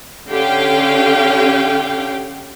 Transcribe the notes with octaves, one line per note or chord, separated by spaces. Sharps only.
D3 C#4 G4 F5 G5